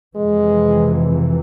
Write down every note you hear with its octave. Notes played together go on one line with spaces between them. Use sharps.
F2 C3 E3 G#3